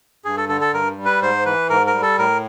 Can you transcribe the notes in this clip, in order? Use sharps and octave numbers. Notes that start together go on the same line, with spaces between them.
G2 G#4
A4
D3 A4
A4
G2 A#4
G3
B4
G#2 C5
E3 B4
G#2 A#4
A#4
G3
A4
A2 A#4